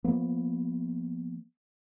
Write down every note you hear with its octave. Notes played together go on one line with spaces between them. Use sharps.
F3 A#3 B3